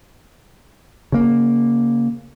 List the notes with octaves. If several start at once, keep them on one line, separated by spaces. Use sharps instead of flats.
C#3 A#3